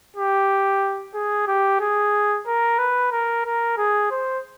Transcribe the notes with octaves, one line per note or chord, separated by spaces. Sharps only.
G4
G#4
G4
G#4
A#4
B4
A#4
A#4
G#4
C5